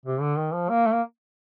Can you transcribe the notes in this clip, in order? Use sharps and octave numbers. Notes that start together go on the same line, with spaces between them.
C3
D3
D#3
F3
A#3
A3
A#3